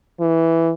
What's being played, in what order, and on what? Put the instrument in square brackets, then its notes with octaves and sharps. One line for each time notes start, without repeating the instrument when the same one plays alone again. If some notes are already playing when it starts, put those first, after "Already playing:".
[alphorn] E3